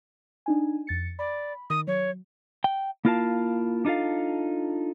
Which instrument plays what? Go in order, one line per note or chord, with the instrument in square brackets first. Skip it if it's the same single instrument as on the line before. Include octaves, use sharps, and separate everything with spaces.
[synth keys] D4 D#4 G#5
F2 A6 C#7
[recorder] D5 [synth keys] B5
[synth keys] D#3 [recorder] D#6
[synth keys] F#3 [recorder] C#5
[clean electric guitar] G5
A#3 E4 F4 A#4 F5 A5
D4 D#4 F4 A4 F5